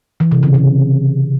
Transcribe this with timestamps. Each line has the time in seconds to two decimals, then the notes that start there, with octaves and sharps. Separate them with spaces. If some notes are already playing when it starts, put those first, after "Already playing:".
0.20 E3
0.32 C3
0.43 C#3
0.54 C3